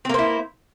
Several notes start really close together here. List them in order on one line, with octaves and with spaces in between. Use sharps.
C4 A#3 C5 E4